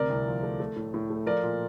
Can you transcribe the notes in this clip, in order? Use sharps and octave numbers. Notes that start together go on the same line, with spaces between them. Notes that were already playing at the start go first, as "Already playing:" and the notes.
Already playing: D2 C3 A#4 D5
C2
F3
A3
A3
A2
A2
A3
F3 A#4 D5
A#2